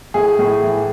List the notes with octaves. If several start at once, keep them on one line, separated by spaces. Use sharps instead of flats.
A2 G#4
A2
E3